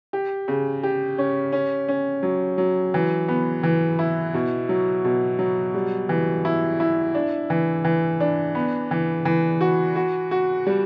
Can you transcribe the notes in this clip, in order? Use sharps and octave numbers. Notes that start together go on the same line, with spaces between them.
G4
C#3
G4
C#4
C#4
C#4
F#3
F#3
E3
B3
E3
E4
B2
F#3
B2
F#3
G3
E3
E4
E4
D4
E3
E3
D4
B3
E3
E3
F#4
F#4
F#4
G3